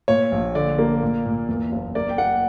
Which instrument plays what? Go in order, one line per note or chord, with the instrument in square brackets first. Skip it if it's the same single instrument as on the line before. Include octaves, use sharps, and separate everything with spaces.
[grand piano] A#2 C#5
A#1
D3 D5
A#3
A#2
A#2
E2
F#1
A#3 D5
G5
A#3 F#5